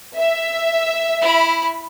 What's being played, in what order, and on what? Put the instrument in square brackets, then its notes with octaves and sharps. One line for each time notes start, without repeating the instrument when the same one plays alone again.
[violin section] E5
[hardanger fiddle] E4 B5